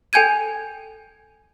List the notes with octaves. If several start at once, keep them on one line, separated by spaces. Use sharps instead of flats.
A4 G5 G#5 G6 G#6 D#7